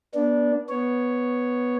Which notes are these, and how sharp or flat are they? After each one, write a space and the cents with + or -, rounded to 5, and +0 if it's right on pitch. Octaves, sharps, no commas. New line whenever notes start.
B3 -35 D4 -10
B3 +0 C#5 +0